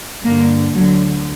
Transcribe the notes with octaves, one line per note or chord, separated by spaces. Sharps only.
G2 D3 A#3
D2 D3 F#3